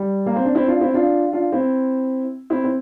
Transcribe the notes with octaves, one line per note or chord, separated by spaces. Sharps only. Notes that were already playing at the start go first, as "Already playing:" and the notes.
Already playing: G3
A#3
C4
D4
C4 E4
D4 F4
C4 E4
D4 F4
D4 F4
C4 E4
C4 E4
C4